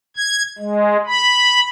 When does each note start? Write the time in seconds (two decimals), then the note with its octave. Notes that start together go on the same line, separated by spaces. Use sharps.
0.16 G#6
0.59 G#3
1.06 B5